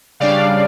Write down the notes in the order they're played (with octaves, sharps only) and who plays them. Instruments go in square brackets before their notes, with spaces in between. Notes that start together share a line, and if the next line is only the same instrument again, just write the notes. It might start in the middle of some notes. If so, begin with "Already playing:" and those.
[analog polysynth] C#3 G3 D4 D5 F5